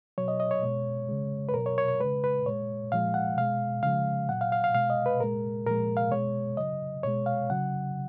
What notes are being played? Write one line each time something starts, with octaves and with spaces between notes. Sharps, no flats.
B2 F#3 C#5
D#5
D#5
C#5
B2 G#3
C#3 G#3
B4
B2 F#3 A#4
C#5
C#5
C#5
C#3 G#3 B4
B4
A#2 G#3 C#5
A#2 F3 G#3 F5
F#5
B2 G#3 F5
C#3 F3 G#3 F5
A#2 F#3 F#5
F5
F5
F5
B2 G#3 F5
D#5
B4
A#2 G#3 A#4
A#2 F3 G#3 A#4
F5
B2 G#3 C#5
C#3 F#3 D#5
B2 G#3 C#5
F5
C#3 F#3 F#5